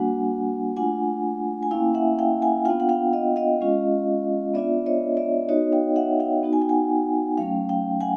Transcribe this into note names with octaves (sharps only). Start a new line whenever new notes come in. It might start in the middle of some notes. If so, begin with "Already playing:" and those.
Already playing: G3 A#3 D4 F#4 F#5 G#5
A3 D4 F4 F#5 G#5
G#5
A#3 C#4 E4 F5 G5
E5 F#5
F5 G5
F#5 G#5
B3 D4 F4 F5 G5
F#5
F5 G5
D#5 F5
D#5 F5
G#3 C#4 F4
B3 D4 F4 D5 E5
C#5 D#5
D5 E5
B3 D#4 F#4 C#5 D#5
F5 G5
E5 F#5
F5 G5
B3 D#4 F#4
G#5
G5
F#5 G#5
F#3 A3 C#4 F5 G5
F5 G5
F#5 G#5